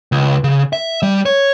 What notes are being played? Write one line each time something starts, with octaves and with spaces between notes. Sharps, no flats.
C#2
C#3
E5
G3
C#5